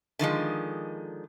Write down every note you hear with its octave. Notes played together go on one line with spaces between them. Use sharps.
D3 D#3 F3 G#3